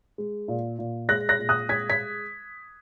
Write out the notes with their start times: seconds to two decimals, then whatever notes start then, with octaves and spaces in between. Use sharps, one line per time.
0.18 G#3
0.48 A#2
0.78 A#2
1.08 G#3 F#6 A#6
1.29 F#6 A#6
1.39 A#2
1.49 D#6 F#6
1.69 G#3 G#6 B6
1.90 G#6 B6